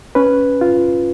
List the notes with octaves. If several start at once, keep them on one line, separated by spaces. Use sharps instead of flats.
C#4 B4
F4